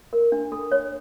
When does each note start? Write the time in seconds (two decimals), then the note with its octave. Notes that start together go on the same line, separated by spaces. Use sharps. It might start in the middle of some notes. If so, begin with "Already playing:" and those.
0.13 A#4
0.32 D4
0.52 A4
0.72 C#5